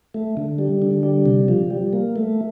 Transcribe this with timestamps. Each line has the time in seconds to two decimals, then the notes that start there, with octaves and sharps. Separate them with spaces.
0.14 A3
0.37 D3
0.58 G3
0.82 D3
1.03 G3
1.26 C3
1.48 F3
1.70 G3
1.93 A#3
2.16 A3